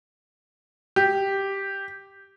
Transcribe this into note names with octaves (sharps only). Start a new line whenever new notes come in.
G4